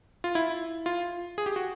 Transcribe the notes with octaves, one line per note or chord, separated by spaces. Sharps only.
F4
E4
F4
G#4
G4
F#4